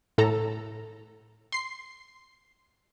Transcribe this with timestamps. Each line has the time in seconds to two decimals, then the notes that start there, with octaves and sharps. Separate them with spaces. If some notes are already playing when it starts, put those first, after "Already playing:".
0.18 A2 A4 A#5
1.52 C6 C7